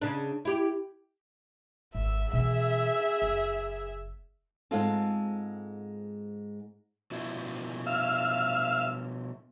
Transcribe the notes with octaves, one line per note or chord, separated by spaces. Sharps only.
C#3 D4
E4 G4
G#1 E5
B2 E3 G#4 E5
F#1
G#2 G#3 C4 F4 A4 A5
B2 F3 E4
E5 F5